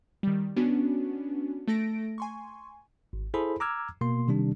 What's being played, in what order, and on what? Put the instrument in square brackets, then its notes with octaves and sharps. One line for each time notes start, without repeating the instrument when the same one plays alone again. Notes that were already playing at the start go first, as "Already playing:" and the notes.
[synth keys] D#3 G3
B3 C#4 D4 F#4
A3 A4 A#6 D7
G#5 C6 C#6
[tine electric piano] G#1
E4 G#4 A4 C5 B5
A#5 D6 E6 F6 G#6
B2 A#3 C6
C3 D#3 G3 D4